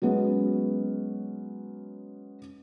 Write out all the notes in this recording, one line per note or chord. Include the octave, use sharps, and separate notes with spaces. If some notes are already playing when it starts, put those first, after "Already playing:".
F#3 G#3 B3 C#4